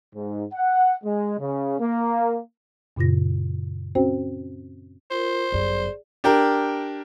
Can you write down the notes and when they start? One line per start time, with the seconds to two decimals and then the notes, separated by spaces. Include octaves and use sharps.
0.15 G#2
0.53 F#5
1.04 G#3
1.39 C#3
1.80 A#3
2.97 F#2 A#2 C#3 F4 A#6
3.95 C4 C#4 F#4 C5 G5
5.11 F4 A#4 C5
5.52 G1 F#2 G#4 D5
6.24 D4 G4 A#4